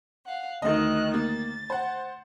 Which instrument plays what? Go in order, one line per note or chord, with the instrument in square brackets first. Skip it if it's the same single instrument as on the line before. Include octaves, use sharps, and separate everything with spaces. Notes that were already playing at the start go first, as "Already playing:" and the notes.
[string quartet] F5 F#5
[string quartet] D2 D#3 F#6 [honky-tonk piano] D#5
[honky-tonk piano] A#3 [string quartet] A6
[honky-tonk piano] C5 F#5